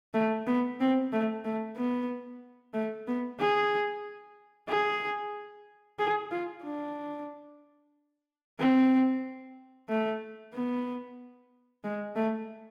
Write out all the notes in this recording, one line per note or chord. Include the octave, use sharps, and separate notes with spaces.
A3
B3
C4
A3
A3
B3
A3
B3
G#4
G#4
G#4
F4
D4
C4
A3
B3
G#3
A3